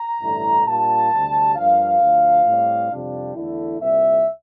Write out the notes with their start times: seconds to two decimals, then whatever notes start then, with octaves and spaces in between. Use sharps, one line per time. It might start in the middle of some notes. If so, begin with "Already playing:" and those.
Already playing: A#5
0.21 A1 G2 D3 A3 E4
0.66 A#2 G3 A#3 D4 F4 A5
1.11 D2 C3 G3
1.56 G2 F3 A#3 D4 F5
2.01 D2 D3 F3 A3
2.45 A2 G3 C4
2.91 F2 C3 G3 D4 F4
3.35 E2 D3 A3 E4
3.80 C2 A#2 G3 C4 E5